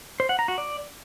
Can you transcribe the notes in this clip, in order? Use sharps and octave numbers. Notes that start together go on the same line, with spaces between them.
C5
F#5
A#5
F#4
D5